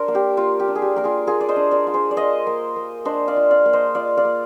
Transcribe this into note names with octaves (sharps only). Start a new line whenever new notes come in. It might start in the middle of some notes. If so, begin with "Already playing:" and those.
Already playing: D4 A#4 C5
A#3
G4
A#3 F4
G4
D4
G#4
G4
A#3 A#4
F4 G#4
A#3 F4 G#4
D5
C5 D#5
D4
A#4 D5
F4
G#4 C5
D5
F4 C5 D#5
A#3
A#3
D4 C5 D#5
D5 F5
F4
D5 F5
A#3
C5 D#5
F4 D5 F5
D5 F5
A#3